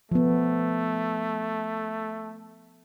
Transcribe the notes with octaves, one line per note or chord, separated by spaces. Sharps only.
F3 A3 B3